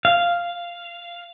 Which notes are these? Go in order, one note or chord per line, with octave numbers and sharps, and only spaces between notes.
F5